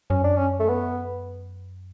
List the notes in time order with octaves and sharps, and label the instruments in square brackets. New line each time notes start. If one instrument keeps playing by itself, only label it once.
[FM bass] F#2 [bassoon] C#4
[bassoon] D4
C#4
A3
B3